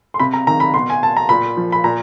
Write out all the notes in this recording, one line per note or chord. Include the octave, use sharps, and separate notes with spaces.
C6
C3 B5
A#5
D#3 A#5
B5
B2 C6
G#5
A5
A#5
A#2 B5
F3
B5
A#2 A#5